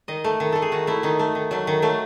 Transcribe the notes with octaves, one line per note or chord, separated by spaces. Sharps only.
D#3 D#5
A3
D#3
A3 A4
G#4
D#3 F#4
A3 E4
D#3 D#4
A3
D#3
F#3 A3
D#3
F#3 A3